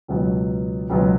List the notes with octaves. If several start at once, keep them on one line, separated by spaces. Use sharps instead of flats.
C#2 B2 F#3 B3
C#2 B2 F#3 B3